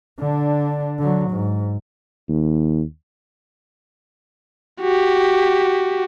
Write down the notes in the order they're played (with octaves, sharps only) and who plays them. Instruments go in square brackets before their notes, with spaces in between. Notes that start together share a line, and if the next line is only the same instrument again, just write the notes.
[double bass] D3 D4
D3 F#3
G#2
[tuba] D#2
[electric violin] F#4 G4